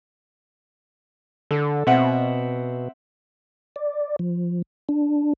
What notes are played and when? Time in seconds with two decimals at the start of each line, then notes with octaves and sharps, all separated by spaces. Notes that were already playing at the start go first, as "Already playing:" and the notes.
1.51 D3 A4
1.87 B2 C4 E5 F#5
3.76 D5
4.19 F3
4.89 D4